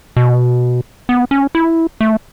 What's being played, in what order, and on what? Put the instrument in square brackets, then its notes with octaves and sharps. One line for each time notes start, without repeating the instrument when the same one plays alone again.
[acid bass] B2
B3
C#4
E4
A3